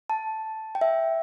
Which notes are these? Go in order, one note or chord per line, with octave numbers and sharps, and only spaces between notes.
A5
G5
E5